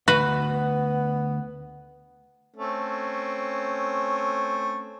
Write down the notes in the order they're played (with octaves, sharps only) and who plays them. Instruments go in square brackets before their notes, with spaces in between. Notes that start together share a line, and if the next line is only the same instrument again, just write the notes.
[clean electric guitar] D2 [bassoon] B3 [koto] F#4 B4
[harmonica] A3 C4 C#4